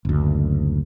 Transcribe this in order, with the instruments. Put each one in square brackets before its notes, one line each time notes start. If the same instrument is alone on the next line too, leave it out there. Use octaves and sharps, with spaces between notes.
[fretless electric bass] F#1 D2